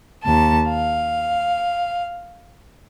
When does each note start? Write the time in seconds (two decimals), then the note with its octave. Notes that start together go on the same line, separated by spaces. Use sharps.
0.24 D#2 A5
0.70 F5